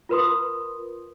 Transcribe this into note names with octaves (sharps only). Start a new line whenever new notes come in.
F4 A#4 B4 C6 D#6